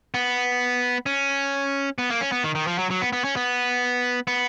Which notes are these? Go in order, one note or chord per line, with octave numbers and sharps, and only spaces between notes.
B3
C#4
B3
A#3
C#4
B3
D#3
D#3
F3
F#3
F#3
B3
B3
C#4
B3
B3